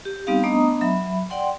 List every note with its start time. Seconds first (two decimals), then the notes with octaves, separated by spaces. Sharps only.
0.05 G4
0.27 G3 B3 C4 D#4 G4 F5
0.44 A3 B3 D4 D#5 A#5 D#6
0.81 F#3 E5 B5
1.30 D5 F#5 G5 C6